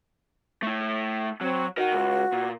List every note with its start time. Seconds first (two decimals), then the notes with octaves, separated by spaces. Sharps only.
0.63 A3 E4
1.41 F#3 C4
1.77 F#4 A#4 D#5
1.92 C#2
2.32 A#2